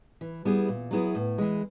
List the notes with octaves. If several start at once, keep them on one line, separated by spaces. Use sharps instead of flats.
E3
G3 B3 E4 G#4
A#2
F#3 B3 E4 G#4
A2
E3 G#3